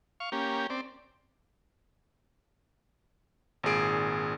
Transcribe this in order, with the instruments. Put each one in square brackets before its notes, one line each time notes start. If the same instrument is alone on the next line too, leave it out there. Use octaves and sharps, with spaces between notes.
[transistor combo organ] F5 C#6
A#3 C#4 G4
C4 D5
[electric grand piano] G#1 A#2 G#4 D7